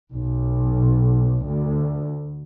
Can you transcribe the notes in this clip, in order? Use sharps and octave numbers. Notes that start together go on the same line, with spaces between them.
B1
D2